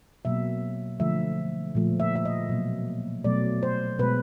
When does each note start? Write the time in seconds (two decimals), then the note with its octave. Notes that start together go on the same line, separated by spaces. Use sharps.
0.25 B2 F#3 A#3 E5
0.99 D3 F3 A3 E5
1.75 A#2 F3 A3
2.00 E5
2.16 E5
2.25 D#5
2.49 B2 F#3 A#3
3.24 B2 F#3 A3 D5
3.63 C5
3.99 B2 G#3 B4